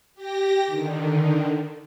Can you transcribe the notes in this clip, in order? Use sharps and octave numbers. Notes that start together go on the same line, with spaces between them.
G4 A#6
D3 D#3